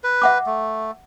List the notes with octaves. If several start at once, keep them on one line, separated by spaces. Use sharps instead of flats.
B4
E5 F#5 D6
A3